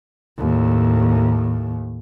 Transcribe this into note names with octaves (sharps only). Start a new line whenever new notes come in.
D#2 A2